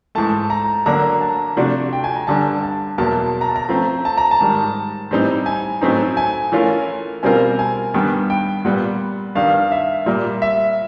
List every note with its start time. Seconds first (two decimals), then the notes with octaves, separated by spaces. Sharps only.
0.15 G#2 E3 A3 A5
0.50 A#5
0.86 D3 F#3 A#3 D4 F#4 A#5
1.21 A5
1.57 C3 F3 A3 D4 F#4
1.93 G5
2.04 G#5
2.16 A#5
2.27 G2 D3 G3 A5
2.62 A5
2.98 E2 B2 F#3 A#3 A5
3.41 A#5
3.49 A5
3.56 A#5
3.69 F3 A3 C4
4.05 A5
4.17 A#5
4.31 A5
4.41 G#2 D#3 G3
5.11 A2 E3 G3 C4 D#4
5.46 G#5
5.82 A2 F#3 A3 C4 D#4
6.17 G#5
6.52 E3 A3 C#4 F4 A#4
7.23 B2 G3 C4 F4 A#4 G#5
7.59 G#5
7.94 G2 D#3 G3 B3 G5
8.30 G5
8.65 A#2 G3 B3 F#5
9.35 G2 D#3 G3 F5
9.71 E5
10.06 A#2 G3 A#3
10.42 E5